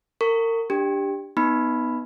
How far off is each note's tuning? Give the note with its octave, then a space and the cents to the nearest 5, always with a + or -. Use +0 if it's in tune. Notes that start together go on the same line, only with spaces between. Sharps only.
A#4 -35 F#5 +0 C#6 +10
D4 +0 G4 +5
B3 +0 D#4 +0 B5 +0